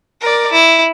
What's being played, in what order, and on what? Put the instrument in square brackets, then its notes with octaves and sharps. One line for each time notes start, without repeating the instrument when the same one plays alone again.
[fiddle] A#4 D5
E4